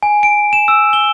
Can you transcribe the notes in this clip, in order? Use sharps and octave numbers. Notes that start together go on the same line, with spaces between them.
G#5
D7
E7
E6
G7